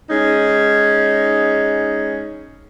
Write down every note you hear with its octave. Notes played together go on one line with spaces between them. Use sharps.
G#3 C#4 D#4